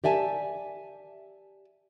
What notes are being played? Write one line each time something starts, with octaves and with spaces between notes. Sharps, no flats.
G4 D5 E5 G#5 A5